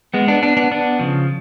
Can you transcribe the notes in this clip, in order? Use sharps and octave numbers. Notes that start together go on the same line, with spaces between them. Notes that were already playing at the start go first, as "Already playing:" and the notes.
G#3 B3
B3 D4
B3 D4
B3 D4
B3 D4
C#3 F3